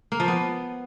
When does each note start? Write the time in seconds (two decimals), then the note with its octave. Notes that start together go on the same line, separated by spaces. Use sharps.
0.12 A#3
0.20 F3
0.28 B3